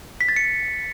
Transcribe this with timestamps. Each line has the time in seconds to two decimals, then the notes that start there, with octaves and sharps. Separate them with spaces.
0.21 B6
0.28 A6
0.36 C#7